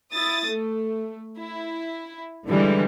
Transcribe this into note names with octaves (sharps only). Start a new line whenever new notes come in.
E4 D#6 A6
A3
E4
D3 E3 G3 G#3